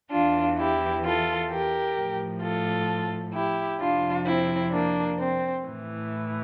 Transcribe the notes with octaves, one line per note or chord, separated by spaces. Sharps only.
E2 E3 D4 F4
E4 G4
F4 A4
G4 A#4
A2 F3
F4 A4
E4 G4
F2 C3 F3 D4 F4
C4 E4
A#3 D4
C4
A2 E3